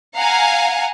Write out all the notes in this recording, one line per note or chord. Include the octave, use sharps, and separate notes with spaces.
F5 F#5 G#5 A#5